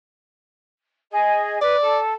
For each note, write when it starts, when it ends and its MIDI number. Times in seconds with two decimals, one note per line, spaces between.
1.11 1.57 68
1.11 1.57 75
1.61 1.75 71
1.61 1.99 74
1.81 2.13 69